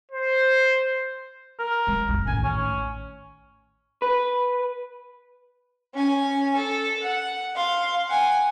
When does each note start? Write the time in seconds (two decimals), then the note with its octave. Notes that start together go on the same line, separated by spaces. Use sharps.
0.11 C5
1.59 A#4
1.87 F#3 G#3
2.08 A#1 F2
2.27 A1 D#2 G#5
2.44 C#4
4.02 B4
5.95 C#4 G#5
6.56 A4
7.02 F#5
7.56 F5 C6
8.08 F#5 G#5